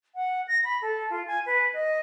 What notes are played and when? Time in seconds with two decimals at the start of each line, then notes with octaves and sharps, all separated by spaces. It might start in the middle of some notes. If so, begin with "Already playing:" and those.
0.15 F#5
0.48 A#6
0.64 B5
0.82 A4
1.10 F4
1.27 G#5
1.46 B4
1.74 D#5